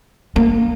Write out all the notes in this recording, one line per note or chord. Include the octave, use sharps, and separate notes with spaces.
A#3